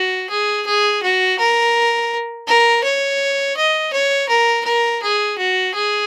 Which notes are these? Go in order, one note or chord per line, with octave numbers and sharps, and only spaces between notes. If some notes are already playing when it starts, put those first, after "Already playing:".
Already playing: F#4
G#4
G#4
F#4
A#4
A#4
C#5
D#5
C#5
A#4
A#4
G#4
F#4
G#4